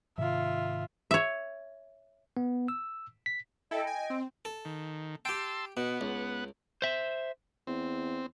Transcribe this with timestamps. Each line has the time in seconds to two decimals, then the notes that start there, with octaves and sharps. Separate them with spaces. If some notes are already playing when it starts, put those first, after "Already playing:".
0.18 G#2 C3 D#3 F4 E5
1.11 C#5 E5
2.37 B3
2.68 E6
3.26 B6
3.71 E4 A4 D#5 G5
3.87 G#5
4.10 C4
4.45 A4
4.65 D#3
5.25 G4 G5 A5 C6 E6
5.77 B2 B3 F#5
6.01 C#2
6.82 C5 E5
7.67 E2 C4